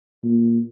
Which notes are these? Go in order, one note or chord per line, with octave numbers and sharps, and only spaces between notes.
A#2